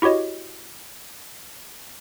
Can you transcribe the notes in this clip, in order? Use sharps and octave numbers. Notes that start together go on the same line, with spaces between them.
E4 F#4 G4 C#5 D#5